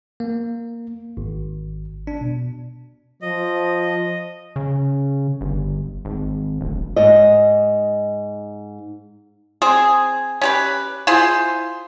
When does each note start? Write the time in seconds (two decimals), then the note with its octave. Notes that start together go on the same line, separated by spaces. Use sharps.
0.20 A#3
1.17 G#1
2.07 D4
2.21 B2
3.22 F3 D#5
4.56 C#3
5.41 G1
6.05 G#1
6.61 D1
6.96 G#2 D#5
9.62 C4 G#4
10.41 C#4 G4 B4
11.07 E4 F4 G#4 C5